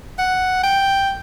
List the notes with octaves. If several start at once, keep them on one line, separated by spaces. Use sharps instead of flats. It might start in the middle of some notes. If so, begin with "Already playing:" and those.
F#5
G5